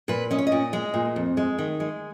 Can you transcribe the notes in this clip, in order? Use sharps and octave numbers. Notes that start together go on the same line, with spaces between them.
A#2 B4
C#4 D#5
C#5
D#5
A#2
G#3
A#2
F2
G#3
D#3
G#3